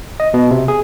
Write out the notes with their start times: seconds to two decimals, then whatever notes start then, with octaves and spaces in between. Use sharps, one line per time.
0.20 D#5
0.34 B2
0.51 C3
0.68 G#4